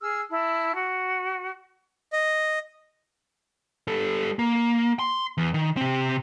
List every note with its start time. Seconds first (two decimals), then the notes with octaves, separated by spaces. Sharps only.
0.01 G#4 E6 F6
0.31 E4 A5
0.76 F#4
2.13 D#5
3.88 G3 A4
4.39 A#3
4.99 C6
5.38 E2
5.54 D#3
5.77 C3 C4